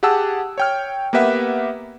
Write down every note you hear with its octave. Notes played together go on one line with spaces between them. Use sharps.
G4 G#4 F#5 A5 E6
C#5 G5 F6
A#3 B3 G4 B4 E5 F#5